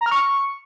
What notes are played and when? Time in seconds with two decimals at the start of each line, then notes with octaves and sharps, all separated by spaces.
0.01 A#5
0.06 F6
0.11 C#6